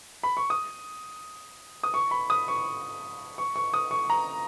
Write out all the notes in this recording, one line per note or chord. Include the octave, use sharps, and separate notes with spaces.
B5
C#6
D#6
D#6
C#6
B5
D#6
C#6
C#6
C#6
D#6
C#6
A#5